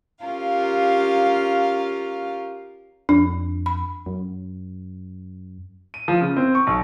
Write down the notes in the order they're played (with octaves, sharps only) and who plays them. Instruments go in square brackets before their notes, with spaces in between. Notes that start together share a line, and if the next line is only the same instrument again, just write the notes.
[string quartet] C#4 F4 G4 A#4 F5
[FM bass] F2 [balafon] D4
[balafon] B5
[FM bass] F#2
[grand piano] D#7
F3
C#3
C4
C#6
B1